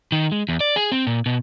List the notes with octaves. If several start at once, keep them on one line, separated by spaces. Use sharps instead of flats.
D#3
G#3
E2
D5
G#4
C4
A#2
B2